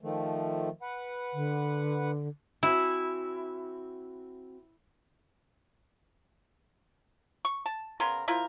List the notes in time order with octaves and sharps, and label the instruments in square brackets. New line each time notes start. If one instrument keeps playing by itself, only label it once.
[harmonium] D#3 F3 A3
B4 F#5
[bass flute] D3
[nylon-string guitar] C4 F#4 G#5 [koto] E4
[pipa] C#6
A5
C#3 B3 A#4 C6
F3 E4 F4 A#4